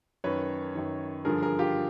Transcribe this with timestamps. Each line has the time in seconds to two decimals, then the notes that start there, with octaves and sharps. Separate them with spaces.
0.24 F#2 D#3 B4 C#5
0.75 F#2 D#3
1.25 G2 D3 F3 G#4 A#4
1.42 G#4 A#4
1.59 F4 G4